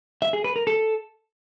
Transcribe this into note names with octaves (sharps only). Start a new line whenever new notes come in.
E5
G#4
B4
A#4
A4